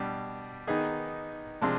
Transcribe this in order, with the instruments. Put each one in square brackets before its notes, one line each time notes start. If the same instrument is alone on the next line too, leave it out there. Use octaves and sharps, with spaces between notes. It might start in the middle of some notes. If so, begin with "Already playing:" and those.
Already playing: [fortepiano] B2 G3 D4
D#3 B3 D#4 G#4
C3 F3 G#3 D4